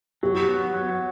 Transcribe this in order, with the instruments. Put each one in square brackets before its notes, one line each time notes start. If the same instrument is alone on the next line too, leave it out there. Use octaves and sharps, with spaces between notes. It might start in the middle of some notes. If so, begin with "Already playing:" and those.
[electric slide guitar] F#3 [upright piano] G4
[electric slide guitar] B3
F#3